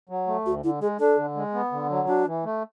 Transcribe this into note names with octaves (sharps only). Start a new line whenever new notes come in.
F#3
A3
D2 F#4
D3 E4
G#3 G#4
D4 A4
D3
G#3
B3
D3
F#3
D4 F#4
E3
A3